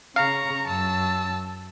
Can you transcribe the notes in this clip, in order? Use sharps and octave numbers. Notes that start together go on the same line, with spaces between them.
C#3 F5 A#5 C#6
F#2 A5 E6